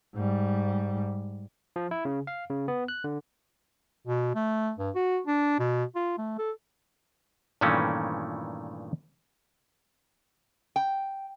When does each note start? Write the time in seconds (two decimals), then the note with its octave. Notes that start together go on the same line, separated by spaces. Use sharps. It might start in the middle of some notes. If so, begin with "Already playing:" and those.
0.15 G#2 G3
1.76 F3
1.91 E4
2.05 C#3
2.27 F5
2.50 C#3
2.68 B3
2.88 F#6
3.04 D3
4.07 B2
4.35 A3
4.78 G2
4.95 F#4
5.27 D4
5.59 B2
5.95 F4
6.18 A3
6.38 A4
7.61 G2 A#2 D#3 E3 A3 C#4
10.76 G5